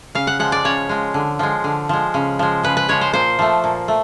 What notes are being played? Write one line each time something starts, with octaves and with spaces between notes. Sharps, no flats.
C#3 F5
F#5
F3 G#3 F#5
D5
C#3 C#5
F3 G#3
D3
F3 G#3
D3
F3 G#3
C#3
F3 G#3
C#3 B4
B4
F3 G#3 C#5
C5
A#2 C5
F3 A3
A#2
A3